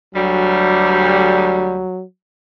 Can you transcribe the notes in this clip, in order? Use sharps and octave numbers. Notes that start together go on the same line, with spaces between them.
D2 F#3 G3